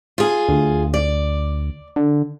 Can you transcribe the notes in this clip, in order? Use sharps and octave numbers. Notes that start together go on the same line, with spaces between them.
F4 G#4
D2
D5
D3